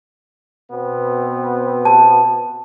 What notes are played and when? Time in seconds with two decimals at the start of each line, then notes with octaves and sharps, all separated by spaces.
0.71 B2 B3 C4
1.85 A5